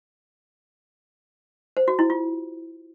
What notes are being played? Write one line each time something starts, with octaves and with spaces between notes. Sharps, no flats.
C5
F#4
E4
F4